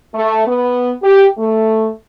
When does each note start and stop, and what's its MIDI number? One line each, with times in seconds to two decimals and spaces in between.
0.14 0.44 57
0.46 0.92 59
1.03 1.26 67
1.38 1.88 57